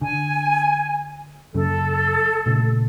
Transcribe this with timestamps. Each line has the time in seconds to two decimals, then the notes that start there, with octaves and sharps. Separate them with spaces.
0.01 D3 G#5
1.54 F#2 C#3 A4
2.46 A#2 C#3 A3